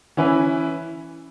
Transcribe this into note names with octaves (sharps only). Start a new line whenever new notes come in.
E3 C#4 E4 B4